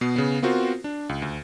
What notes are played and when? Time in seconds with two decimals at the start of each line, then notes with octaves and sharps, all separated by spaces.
0.01 B2 B3 C7
0.16 C#3 B3
0.42 B3 C4 F4 F#4 A#4 C5
0.84 D4
1.09 C#2
1.22 D2